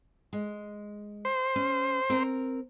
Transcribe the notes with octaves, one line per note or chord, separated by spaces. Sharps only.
G#3
C5
C#4
C4 A#4